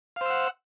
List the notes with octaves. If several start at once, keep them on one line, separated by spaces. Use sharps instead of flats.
C5 F5 F#5 E6